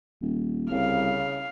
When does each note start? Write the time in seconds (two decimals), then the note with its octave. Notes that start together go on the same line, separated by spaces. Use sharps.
0.21 D#1
0.71 C2 C#3 F5